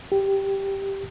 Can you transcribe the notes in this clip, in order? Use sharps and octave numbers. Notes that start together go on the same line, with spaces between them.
G4